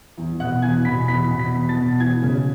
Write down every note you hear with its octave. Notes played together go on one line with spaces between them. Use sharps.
E2
B2 F#5 F#6
E2 G#5 G#6
B2 B5 B6
E2 B5 B6
B2
B5 B6
E2
A5 A6
B2
E3 G#5 G#6
C#3